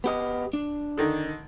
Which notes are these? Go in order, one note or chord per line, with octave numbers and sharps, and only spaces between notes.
B3 G4 D#5
D4
D3 D#3